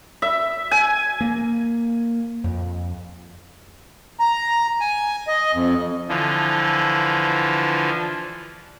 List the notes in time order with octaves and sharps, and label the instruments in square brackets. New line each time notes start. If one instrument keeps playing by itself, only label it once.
[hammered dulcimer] E5
G#5
[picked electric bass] A#3
F2
[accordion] A#5
G#5
D#5
F2
[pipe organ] D3 E3 F3